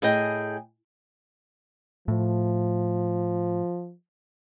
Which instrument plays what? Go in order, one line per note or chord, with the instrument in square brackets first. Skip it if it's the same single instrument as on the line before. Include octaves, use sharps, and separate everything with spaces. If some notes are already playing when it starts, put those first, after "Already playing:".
[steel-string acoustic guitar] A2 G#4 D#5 G5 G#5
[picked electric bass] A2 [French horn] F3